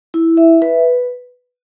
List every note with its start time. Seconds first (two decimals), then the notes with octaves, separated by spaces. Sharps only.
0.14 E4
0.37 E5
0.62 B4